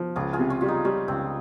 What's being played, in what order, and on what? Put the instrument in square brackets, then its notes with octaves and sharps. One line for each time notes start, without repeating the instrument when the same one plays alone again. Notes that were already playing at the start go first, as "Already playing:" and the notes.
Already playing: [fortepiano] F3
[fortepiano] C#2 [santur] F4 G#4
[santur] F4 G#4
[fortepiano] C3
[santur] C#4 F4
[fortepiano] G3 [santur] F4
[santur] D#4
[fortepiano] G3 [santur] C#4
[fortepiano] C#2 [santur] C4